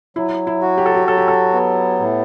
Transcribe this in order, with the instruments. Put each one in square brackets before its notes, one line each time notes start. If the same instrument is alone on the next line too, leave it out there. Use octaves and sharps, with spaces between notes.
[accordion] F#3 [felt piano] E4
[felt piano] E4
[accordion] F#4
[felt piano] G4
A4
G4
[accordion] F#3 [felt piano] A4
[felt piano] G4
A4
[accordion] B3
A2